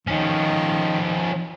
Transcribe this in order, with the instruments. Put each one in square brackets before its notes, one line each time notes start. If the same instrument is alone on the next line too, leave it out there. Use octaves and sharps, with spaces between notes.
[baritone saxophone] D#3 [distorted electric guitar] F3 C#4